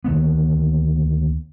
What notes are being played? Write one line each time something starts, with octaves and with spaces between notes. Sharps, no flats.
D2 D#3 A#3 B3